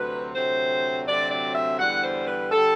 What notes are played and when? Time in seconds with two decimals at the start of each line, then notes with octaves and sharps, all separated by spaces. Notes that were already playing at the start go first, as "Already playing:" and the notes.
Already playing: D2 C3 F#3 C4 B4
0.35 D2 C3 F#3 C4 C5
1.06 D2 C3 F#3 C4 D5
1.31 D5
1.55 E5
1.79 E2 D3 G3 F#5
2.04 C5
2.27 B4
2.51 D3 G3 A4